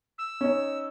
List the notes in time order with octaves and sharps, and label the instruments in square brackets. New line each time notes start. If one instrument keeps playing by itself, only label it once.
[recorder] E6
[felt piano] C#4 D#4